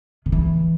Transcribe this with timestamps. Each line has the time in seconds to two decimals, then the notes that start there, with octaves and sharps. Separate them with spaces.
0.26 D#3
0.32 E3